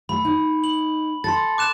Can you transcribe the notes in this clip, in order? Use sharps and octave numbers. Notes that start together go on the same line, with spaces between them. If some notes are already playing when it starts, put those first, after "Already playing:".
A3 B5
D#4
F#7
A4 C6 A6
D6 F#6 E7